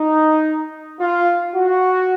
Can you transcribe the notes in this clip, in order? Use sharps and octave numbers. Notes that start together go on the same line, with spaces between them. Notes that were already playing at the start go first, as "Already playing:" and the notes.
Already playing: D#4
F4
F#4